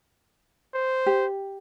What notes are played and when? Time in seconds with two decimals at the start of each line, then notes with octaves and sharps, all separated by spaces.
0.74 C5
1.06 G4